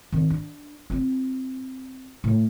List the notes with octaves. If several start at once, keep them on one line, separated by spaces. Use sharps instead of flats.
D#3 C4
D4
C4 F4
A2